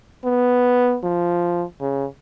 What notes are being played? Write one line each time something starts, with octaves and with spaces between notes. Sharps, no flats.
B3
F3
C#3